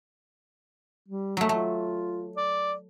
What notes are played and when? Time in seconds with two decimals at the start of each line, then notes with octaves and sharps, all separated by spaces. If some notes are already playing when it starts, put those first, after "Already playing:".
1.08 G3
1.37 F#3 A3
1.49 A3 F4
2.37 D5